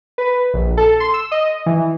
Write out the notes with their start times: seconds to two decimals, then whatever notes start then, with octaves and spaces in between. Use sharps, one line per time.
0.18 B4
0.54 A#1
0.77 A4
1.00 C6
1.14 E6
1.32 D#5
1.66 E3